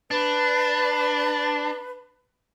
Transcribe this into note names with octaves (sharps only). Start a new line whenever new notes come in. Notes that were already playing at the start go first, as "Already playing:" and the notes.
D4 B4